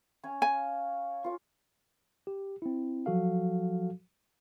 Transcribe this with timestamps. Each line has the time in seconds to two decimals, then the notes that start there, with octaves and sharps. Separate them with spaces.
0.23 C#4 C#5 G#5
0.42 F5 G#5
1.24 F4 C#6
2.27 G4
2.62 C4 E4
3.06 F3 F#3 F#4 A4 F5